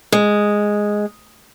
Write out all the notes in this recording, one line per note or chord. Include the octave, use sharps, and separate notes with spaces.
G#3